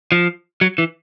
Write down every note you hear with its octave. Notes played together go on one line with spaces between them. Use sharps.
F3
F#3
E3